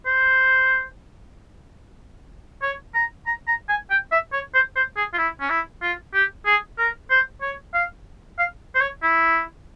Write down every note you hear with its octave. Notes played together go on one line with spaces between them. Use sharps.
C5
C#5
A#5
A#5
A#5
G#5
G5
E5
C#5
C5
C5
G#4
F4
E4
C#4
E4
F4
G4
G#4
A#4
C5
C#5
F5
F5
C5
C#5
E4